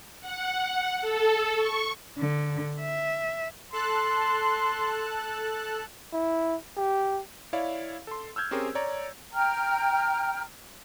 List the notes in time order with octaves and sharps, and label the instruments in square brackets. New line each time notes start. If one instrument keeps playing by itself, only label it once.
[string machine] F#5
A4
C#6
[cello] D3
E5
[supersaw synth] A4 A5 F#6 [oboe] C6
[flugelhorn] E4
G4
[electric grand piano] E4 C#5 D5 F5
A4 C6
E6 F6 G6 G#6
C4 C#4 G4 G#4 A#4 C5
C#5 D5 A#5
[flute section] G5 A#5 F6